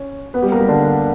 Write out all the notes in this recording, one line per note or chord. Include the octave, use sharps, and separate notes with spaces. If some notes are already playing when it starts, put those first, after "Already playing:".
Already playing: C#4
B3 B4
G3 G4
A#3 A#4
G3 G4
D3 D4